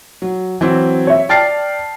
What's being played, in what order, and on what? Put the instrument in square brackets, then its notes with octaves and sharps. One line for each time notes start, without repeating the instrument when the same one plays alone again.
[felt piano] F#3
E3 F#3 C4
[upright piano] C#5 E5
[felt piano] D5 F6 C7 [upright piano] G5 A5 A6